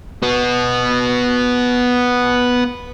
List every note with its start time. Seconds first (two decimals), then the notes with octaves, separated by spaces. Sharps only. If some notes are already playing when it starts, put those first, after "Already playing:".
0.23 B3 F#4